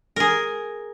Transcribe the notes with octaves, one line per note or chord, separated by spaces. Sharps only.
G#4 A#4